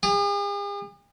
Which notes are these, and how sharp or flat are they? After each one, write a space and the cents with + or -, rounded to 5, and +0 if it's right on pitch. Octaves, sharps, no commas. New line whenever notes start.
G#4 -45